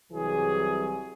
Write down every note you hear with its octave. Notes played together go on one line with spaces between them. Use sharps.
C2 C3 E3 F#3 G3 G#4